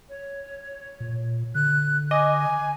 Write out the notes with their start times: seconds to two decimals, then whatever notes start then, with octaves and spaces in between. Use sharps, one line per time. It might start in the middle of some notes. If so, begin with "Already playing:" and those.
0.09 C#5
1.00 A#2
1.55 D3 F#6
2.11 D#5 G#5 D6